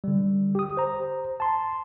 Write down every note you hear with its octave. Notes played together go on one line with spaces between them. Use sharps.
D3 G3
G4 D#6
C5 A#5
A5 C6